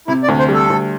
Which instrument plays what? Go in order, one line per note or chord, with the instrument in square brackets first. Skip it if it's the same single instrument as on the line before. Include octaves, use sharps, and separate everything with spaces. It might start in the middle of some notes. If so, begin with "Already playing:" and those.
[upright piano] C3 [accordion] E4
[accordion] D5
[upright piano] D2
[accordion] C5
[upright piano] G3
[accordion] A4
[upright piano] D2